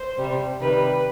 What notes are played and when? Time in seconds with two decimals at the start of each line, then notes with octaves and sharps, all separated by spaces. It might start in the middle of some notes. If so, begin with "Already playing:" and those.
Already playing: C5
0.17 C3 G3
0.61 C3 D#3 G3 B4